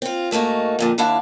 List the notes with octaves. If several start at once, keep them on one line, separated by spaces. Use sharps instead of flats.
C4 F4
G#2 A3 A#3 D#4 F#4
F2 A#2 D3
D#2 D4 E4 F5 F#5